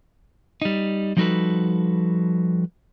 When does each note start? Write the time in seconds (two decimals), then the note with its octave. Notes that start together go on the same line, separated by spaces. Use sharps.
0.62 G3 D#4
1.17 F3 G3 D#4 F#4 A4 B4